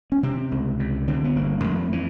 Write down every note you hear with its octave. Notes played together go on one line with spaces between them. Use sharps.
C#4
C3 C4
C#2
C3
D3 C4
B3
G1 A#3
F2 A3
E3